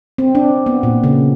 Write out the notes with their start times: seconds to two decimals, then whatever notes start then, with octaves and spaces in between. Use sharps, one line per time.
0.18 C4
0.35 D4
0.66 B3
0.83 A#2
1.04 C#3